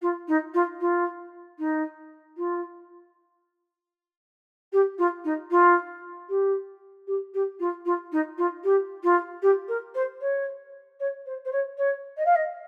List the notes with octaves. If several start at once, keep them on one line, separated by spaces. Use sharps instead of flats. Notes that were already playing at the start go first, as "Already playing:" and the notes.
F4
D#4
F4
F4
D#4
F4
G4
F4
D#4
F4
G4
G4
G4
F4
F4
D#4
F4
G4
F4
G4
A#4
C5
C#5
C#5
C5
C5
C#5
C#5
D#5
F5
D#5